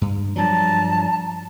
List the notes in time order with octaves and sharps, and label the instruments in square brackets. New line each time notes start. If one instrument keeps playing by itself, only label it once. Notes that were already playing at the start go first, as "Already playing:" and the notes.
[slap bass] G2
[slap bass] G2 F3 F#3 [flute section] D5 A5 A#5